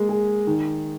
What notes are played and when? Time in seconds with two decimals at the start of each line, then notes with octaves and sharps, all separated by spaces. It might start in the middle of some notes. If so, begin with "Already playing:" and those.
Already playing: G#3 A#3
0.09 G#4
0.47 D#3